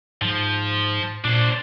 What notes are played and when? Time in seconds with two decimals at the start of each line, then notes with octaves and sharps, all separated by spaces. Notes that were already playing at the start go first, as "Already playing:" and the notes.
0.22 G#2 F3
1.25 A#2 D4 C5